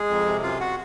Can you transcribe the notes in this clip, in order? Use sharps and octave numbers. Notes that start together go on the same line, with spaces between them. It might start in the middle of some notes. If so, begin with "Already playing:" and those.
Already playing: G#3 G#4
F2
C3
F#2 F4 F5
F#4 F#5